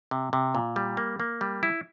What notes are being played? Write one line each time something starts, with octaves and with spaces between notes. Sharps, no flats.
C3
C3
A#2
G3
A#3
A#3
G3
E4